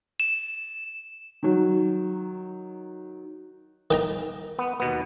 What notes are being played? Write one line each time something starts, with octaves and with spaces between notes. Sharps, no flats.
E7
D#3 F#3
D#3 G5 A#5
B3
D#2 B2 B3